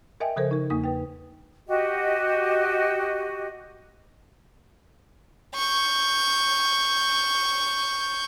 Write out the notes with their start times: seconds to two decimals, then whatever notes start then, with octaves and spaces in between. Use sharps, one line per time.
0.20 A#4 D#5 E5 G5 G#5
0.36 C#3 F3 A4 A#4 C5
0.51 D#4 A#4
0.70 E2 A#3 D#4 D#6
0.84 B4 G5
1.68 F#4 G4 D#5
5.55 C#6 G6